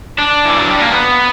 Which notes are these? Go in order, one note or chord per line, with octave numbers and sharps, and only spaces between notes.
D4
E3
F#3
G3
A#3
B3